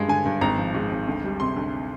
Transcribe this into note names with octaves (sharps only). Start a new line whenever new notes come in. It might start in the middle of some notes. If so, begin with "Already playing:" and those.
Already playing: G2 G#3
D3 G#5
G2
G#1 A#5
F3
G#2
G#1
D2
G3
C3 C6
D2